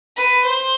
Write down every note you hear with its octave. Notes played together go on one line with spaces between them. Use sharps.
B4
C5